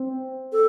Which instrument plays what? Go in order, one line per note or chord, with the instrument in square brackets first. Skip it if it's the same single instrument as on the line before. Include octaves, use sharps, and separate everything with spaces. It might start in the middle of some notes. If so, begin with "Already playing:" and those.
Already playing: [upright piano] C4
[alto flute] A4